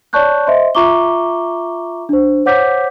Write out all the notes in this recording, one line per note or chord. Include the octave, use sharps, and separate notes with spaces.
C#5 D5 A5 C#6 F#6 G6
C5 D#5 E5 C6
F4 E5 A#5 C#6 D6 G7
D4 C5
C5 C#5 F#5 D6 G6 B6